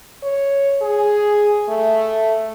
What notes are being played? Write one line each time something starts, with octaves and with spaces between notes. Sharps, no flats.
C#5
G#4
A3